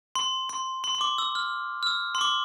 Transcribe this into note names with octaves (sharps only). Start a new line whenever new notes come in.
C6
C6
C6
C6
D6
E6
F6
F6
E6
C6
D6